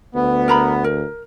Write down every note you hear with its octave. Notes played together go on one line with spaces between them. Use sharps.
D2 B3
A#4 A#5 B5
A#4